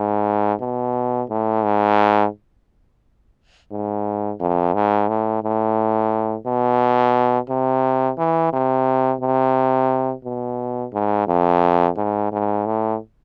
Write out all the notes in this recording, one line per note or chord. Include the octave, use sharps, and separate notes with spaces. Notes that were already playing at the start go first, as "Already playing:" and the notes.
Already playing: G#2
B2
A2
G#2
G#2
F2
G#2
A2
A2
B2
C3
E3
C3
C3
B2
G#2
F2
G#2
G#2
A2